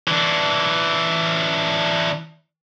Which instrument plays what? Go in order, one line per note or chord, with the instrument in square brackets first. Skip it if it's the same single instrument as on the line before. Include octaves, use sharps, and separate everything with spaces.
[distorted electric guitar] E3 D4